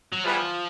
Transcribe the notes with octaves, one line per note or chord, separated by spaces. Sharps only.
F#3
F3 G3 B3 E4 G#4 B4